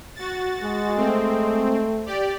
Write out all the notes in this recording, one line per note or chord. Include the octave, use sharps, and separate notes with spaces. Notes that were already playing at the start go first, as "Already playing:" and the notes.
F#4 A6
G#3
A3 C4
G4 D5